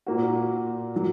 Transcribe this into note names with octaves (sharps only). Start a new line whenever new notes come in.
A#2 A#3 F#4
F#3